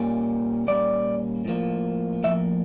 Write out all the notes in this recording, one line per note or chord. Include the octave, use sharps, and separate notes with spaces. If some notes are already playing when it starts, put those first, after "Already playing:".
Already playing: A#2 G3 A#3 C#4
A#2 G3 A#3 C#4 D5
A2 F3 A#3
A2 F3 A#3 E5